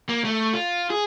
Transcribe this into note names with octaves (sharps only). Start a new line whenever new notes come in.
A#3
A3
F4
G#4